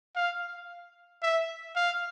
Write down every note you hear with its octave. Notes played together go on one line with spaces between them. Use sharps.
F5
E5
F5